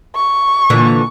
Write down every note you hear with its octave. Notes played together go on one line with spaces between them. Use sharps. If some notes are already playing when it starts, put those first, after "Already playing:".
C#6
A#2 D3 E3